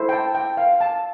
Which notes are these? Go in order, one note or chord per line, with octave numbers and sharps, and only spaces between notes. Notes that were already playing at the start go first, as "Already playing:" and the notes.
Already playing: E4 A4 C5
G5
A5
G5
F5
A5